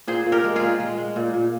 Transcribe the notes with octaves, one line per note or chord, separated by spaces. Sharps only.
A#2 G#4 C5
A#2
G4 A#4
G#3
F4 G#4
A#2
G#3
G#3
A#2
A#2